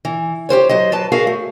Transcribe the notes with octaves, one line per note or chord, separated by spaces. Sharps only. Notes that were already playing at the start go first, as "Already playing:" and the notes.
E3
G4 A#4 C5 C#5
F#3 C5 D#5
F#3 B4 A5
F#4 G#4 A#4 E5 F5
A3